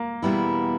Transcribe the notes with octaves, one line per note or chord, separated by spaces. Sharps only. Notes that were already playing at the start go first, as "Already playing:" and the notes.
Already playing: A#3
E2 B2 G3 B3 E4